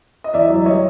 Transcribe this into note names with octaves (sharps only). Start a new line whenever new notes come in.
D#5
E2 D5 E5
F#3
G3 C#5 D#5